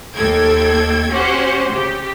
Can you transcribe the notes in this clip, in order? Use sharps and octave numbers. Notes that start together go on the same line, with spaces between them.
D#2 A4 G5 G#6
C#4 F#4 G4 C5 F#5
C#3 G4